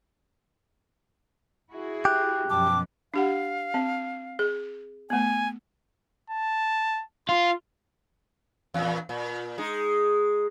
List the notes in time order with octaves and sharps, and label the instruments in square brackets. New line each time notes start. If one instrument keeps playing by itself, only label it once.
[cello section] E4 F#4 G#4
[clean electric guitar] G4 [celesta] F#6
[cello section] F#2 B2 F3 [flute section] G5 A5 D6
[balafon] D4 G4 F#5 [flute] F5
[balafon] C4
G#4
[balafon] A3 B3 [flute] G#5
[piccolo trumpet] A5
[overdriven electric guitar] F4 [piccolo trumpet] C6
[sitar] E2 A#2
A#2
G#3 D#4